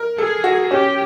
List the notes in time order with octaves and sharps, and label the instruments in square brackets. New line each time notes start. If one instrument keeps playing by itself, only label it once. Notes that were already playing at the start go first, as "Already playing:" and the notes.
Already playing: [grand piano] A#4
[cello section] G#4 [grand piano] A4
[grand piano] F#4
[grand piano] C#4 [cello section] G4